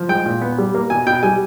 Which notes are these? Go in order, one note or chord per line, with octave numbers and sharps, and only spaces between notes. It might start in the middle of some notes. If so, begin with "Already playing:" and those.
Already playing: F3
G#3 G5
A#2
B3
G3
A#3
B2 G#5
B2 G5
G3 G#5